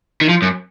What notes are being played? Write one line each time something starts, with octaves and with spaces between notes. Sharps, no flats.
D#3
F3
F#2